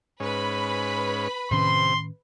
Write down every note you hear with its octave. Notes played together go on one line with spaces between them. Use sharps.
G#2 C#4 B4 B5
A2 C3 D#3 C#4 C6